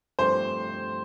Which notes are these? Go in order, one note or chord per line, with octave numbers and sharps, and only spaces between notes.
G2 F3 A3 C4 G4 C5